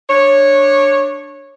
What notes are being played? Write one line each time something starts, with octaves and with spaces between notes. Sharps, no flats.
D4 C#5